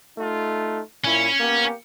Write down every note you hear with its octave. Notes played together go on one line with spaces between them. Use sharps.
A3 D#4 F4
A#2 C#4 E4
A#3 B3 G4